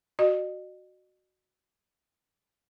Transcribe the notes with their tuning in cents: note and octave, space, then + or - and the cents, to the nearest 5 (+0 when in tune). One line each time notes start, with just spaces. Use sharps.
F#4 +0 D#5 -40